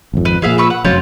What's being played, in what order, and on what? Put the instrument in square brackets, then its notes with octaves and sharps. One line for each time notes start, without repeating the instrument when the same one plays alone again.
[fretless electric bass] G#1 F2
[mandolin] B4
[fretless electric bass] A#2 F3 [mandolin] G#4 E5 F5
[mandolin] B4 C#6 E6
F#5
[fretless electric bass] F1 F#2 F#3 [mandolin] C4 F4 C#5